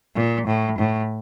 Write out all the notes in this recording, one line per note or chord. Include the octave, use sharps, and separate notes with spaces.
A#2
A2
A2